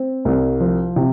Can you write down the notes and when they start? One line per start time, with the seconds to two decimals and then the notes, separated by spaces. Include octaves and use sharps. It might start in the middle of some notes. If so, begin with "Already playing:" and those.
Already playing: C4
0.25 C2
0.60 F3
0.96 C3